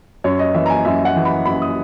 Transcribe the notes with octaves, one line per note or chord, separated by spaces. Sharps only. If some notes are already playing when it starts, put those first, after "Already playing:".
F#2 C#5
D#5
E3 E5
A#5
G#5
F#2 E5
F#5
E3
B5
F#2 B5
D#6